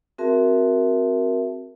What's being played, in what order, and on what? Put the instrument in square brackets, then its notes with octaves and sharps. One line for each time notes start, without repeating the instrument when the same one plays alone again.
[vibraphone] C4 F#4 G#4 A#4 E5 A5